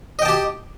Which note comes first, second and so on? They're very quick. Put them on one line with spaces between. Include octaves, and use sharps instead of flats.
D#5 G5 A5 G4